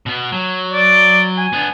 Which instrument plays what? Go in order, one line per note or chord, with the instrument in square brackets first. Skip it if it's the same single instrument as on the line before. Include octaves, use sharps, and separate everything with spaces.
[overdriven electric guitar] B2 B3
F#3
[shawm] D5
G#5
[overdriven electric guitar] B3 D4